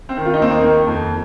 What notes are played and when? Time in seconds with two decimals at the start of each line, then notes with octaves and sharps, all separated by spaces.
0.09 C4
0.17 D#3
0.25 F4
0.34 D#4
0.40 D#2 C4
0.50 A#3 D#4
0.64 D#3
0.87 F2